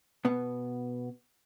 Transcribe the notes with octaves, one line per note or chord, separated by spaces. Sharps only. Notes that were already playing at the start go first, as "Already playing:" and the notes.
B2 B3